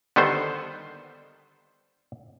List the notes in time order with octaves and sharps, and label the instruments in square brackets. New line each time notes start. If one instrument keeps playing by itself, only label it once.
[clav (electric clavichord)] D3 D#3 G3 B3 A4 C5